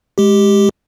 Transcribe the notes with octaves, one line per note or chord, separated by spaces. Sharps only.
G#3 G4